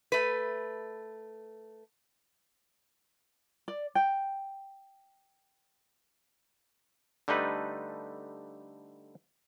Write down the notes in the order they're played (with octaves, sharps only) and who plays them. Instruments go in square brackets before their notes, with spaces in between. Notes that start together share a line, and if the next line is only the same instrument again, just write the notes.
[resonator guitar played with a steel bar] A3 B4
[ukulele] D5
G5
[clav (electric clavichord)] D3 G3 A3 D#4 B4